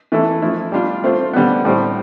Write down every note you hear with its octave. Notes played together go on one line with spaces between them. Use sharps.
E3 A3 E4 A4
F3 A3 E4
G3 D4 F4
A3 C4 F4 C5
D3 G3 B3
A2 G3 C4